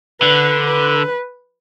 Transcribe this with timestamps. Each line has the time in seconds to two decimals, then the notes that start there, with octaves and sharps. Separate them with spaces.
0.21 D3 B4
0.66 B4